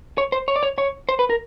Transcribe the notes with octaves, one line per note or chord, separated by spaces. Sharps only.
C#5
C5
C#5
D5
C#5
C#5
C5
B4
A#4